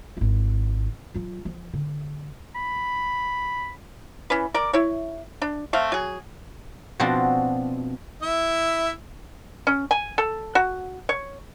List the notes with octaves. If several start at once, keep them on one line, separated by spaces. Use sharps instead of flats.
G#1 E4
F#3 F4
F3
D3
B5
E3 C#4 B4
A#4 D5
E4 C#5
D4
A3 C4 F5
F#3 G#4
B2 F3 C4 D4 F#4
E4 E5
C#4
G#5
A4
F#4
C#5